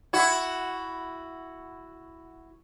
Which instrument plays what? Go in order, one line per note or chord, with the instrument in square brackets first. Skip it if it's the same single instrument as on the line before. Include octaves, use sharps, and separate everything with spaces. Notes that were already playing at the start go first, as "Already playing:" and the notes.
[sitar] E4 F#4